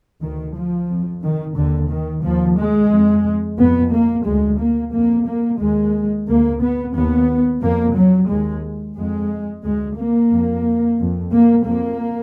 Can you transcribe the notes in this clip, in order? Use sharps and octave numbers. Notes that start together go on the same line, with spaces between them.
D2 D#3
F3
F2
D#3
D#2 D3
D#3
D#2 F3
G#3
F2
F2 B3
A#3
D2 G#3
A#3
F2 A#3
A#3
D#2 G#3
D2 A#3
B3
D#2 B3
F2 A#3
F#3
D#2 G#3
F2 G#3
D2 G#3
A#3
F2
F2
A#3
F2 A#3